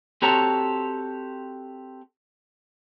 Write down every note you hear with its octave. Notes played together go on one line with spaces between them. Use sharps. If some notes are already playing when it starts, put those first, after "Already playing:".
C4 F#4 G4 A4 C#5 A#5